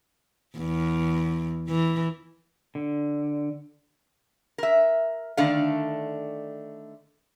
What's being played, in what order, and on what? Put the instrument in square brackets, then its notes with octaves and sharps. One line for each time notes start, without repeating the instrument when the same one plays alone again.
[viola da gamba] E2
E3
[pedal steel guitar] D3
[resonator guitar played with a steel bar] A#4 E5
D3 D#3 A3 D4 F5